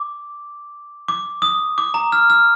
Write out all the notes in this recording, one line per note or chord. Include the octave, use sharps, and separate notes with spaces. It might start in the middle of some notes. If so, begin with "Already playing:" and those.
Already playing: D6
D6
D#6
D6
A#5
F6
F6